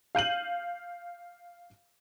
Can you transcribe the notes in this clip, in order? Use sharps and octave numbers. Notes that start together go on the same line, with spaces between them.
F5 G6 D#7 F#7